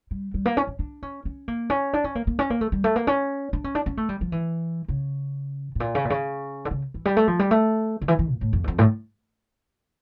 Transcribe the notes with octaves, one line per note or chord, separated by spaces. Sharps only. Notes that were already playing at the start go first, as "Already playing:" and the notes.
G3
G3
A#3
C#4
C#4
D4
C#4
C#4
A#3
C#4
D4
C#4
A#3
A#3
C#4
A#3
A3
G3
A3
A#3
C#4
D4
C#4
D4
C#4
A3
G3
F3
E3
C#3
A2
A#2
C#3
A#2
C#3
D3
C#3
E3
G3
A3
F3
G3
A3
D3
E3
E3
A#2
A2
F2
E2
F2
A2